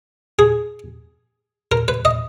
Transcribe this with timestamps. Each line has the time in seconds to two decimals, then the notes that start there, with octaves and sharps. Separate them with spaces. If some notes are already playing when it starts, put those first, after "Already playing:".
0.39 G#4
1.72 A#4
1.88 B4
2.05 D#5